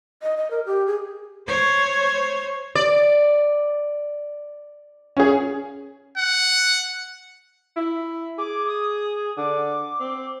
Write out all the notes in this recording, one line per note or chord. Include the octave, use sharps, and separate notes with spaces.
D#5
D#5
A#4
G4
G#4
C5 C#5
D5
C#4 G#4
F#5
E4
G#4 D6
D#6
D3 D6
C4